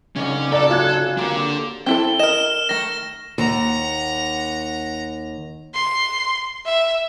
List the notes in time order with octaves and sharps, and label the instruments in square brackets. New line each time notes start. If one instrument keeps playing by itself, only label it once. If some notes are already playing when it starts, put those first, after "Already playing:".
[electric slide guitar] C#3 C4 D#4 [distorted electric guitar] C#4 [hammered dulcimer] C#5 D5
[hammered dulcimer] F#2 F#5 A#5 [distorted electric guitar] A4 A5 [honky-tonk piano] D5
[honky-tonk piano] F4 F#6 G#6 [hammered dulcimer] G#4
[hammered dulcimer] A#3 C4 G4 [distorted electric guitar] D4 A4
[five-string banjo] C4 E4 A4 [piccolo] G7
[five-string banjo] A#4 D#5 [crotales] F6 E7
[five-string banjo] D#3 A3 [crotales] A#6
[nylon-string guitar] D#2 [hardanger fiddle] F#5 A#5
[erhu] C6
E5